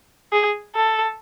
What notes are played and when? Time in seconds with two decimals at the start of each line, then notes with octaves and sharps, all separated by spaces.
0.32 G#4
0.75 A4